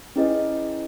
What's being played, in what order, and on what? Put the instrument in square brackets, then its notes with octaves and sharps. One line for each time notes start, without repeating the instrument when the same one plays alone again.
[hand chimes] C#4 E4 G#4 B4 D#5